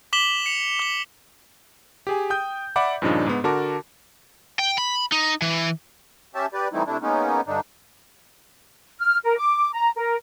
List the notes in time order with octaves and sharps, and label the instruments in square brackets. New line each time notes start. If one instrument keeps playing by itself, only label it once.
[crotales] D6 B6 E7 F#7 G7
C#7 F7
D6 G7
[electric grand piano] G4 G#4 G#5
G5 D#6 G6
D5 E5 F#5 B5 D6
G2 A#2 C#3 F3 D4 D#4
G#2 B3
D3 F#4 A#4 A5 D6
[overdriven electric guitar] G5
B5
D#4
E3
[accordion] C#4 G4 E5 A5
G4 B4 D5
E3 G3 A3 C4 D#4 E4
C3 A3 D4 E4
G#3 A#3 B3 C#4 D#4
G2 D3 D4 D#4
[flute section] F6
A#4
D6
A#5
A#4